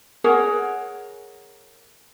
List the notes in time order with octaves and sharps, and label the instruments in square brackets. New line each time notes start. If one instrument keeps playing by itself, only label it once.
[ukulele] G#4 A#4 C#5 F#5